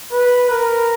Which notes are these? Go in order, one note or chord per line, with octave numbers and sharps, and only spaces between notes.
B4
A#4